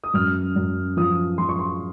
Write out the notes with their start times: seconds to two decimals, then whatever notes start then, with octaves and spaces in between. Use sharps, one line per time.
0.04 D#6
0.14 F#2 F6
0.56 F#2
0.97 F3 D#6
1.38 F3 C6
1.49 C#6
1.59 C6